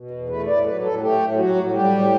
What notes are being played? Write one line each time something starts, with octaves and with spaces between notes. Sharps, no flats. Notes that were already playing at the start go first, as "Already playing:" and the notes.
Already playing: B2
E2
A3 B4
A2 D5
A4
F#3 B4
A2 A4
A3 G4
A2
F#3 F#4
A2
G3 G4
A2